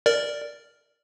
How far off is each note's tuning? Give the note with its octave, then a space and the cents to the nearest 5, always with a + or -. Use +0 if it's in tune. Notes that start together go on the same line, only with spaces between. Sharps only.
A#4 +0 D5 +0